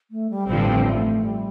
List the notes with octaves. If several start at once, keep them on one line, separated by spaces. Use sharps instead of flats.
A3
G3
A1 G2 D3 F3 G3 C4
A3
G3